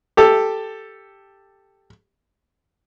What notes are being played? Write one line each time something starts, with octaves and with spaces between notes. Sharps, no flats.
G4 A4